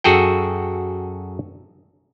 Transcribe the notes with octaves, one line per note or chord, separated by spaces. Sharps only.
F#2 F#4 G#4 A4 G5